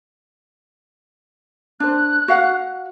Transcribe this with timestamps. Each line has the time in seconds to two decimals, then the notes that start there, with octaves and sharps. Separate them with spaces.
1.80 D4 C5 F#6
2.28 F#4 F5 F#5